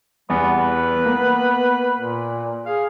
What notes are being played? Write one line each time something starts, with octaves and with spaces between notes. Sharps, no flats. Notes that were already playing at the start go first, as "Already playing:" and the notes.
E2 G3 B3
B4
A#3 B3
A#2
G#4 F5